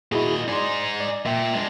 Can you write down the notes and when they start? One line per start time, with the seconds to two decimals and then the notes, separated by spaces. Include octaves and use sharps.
0.12 A#2 E4 F#4 G#4 D#5
0.48 D#4 G#4 D5 C6
1.00 D5
1.26 A#2 E5 G5
1.54 G#3 D4